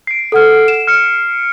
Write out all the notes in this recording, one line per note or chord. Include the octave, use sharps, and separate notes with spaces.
C7 D7
A4 F#5 F6
E7
F6 C#7 D7